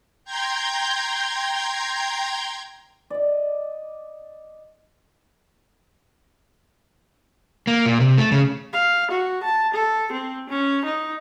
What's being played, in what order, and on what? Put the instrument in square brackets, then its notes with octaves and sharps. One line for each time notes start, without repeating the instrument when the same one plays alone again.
[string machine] G5 A#5 C6 G6 G#6
[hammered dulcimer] D5 D#5
[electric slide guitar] A#3
A#2
C3
A3
C#3
[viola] F5
F#4
A5
A4
C4
C#4
D#4